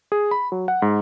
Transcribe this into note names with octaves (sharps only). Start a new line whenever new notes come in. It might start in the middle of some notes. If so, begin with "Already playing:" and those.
G#4
B5
F#3
F#5
G#2